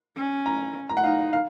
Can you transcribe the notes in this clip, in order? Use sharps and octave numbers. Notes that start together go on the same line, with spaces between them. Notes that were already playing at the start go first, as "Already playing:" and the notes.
C#4
A#5
A#5
F#5
D#4 F5
F5